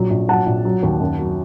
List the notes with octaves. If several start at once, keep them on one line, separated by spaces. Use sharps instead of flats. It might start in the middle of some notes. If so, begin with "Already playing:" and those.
Already playing: A#1 F#3
A#1
F#3 F#5 A5
A#1
F#3
D#2
F#2
F#3